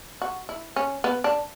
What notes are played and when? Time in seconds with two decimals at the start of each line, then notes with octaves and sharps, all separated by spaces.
0.22 F#4
0.49 E4
0.76 C#4
1.04 B3
1.24 D4